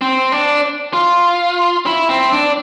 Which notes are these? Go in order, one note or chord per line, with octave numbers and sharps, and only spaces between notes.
C4
D4
F4
E4
C4
D4